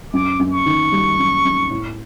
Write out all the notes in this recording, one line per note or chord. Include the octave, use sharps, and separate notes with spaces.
F#2 D6
F#2
C#6
D#3
G3
F#2
F#2
A2